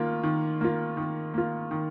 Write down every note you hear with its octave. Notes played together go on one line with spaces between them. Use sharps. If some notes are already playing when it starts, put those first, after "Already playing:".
Already playing: D#3 A#3 F4
D#3
A#3 F4
D#3
A#3 F4
D#3